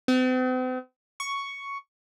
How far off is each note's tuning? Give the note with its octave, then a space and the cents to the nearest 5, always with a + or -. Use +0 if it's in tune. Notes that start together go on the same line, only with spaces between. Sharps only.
C4 -45
C#6 +5